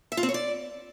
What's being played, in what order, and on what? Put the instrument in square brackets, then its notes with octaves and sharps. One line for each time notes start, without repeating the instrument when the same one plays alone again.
[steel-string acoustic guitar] E5
F4
C4
C#5
D5